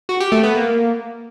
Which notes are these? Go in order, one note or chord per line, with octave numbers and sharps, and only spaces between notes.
F#4
G4
A3
B3
A#3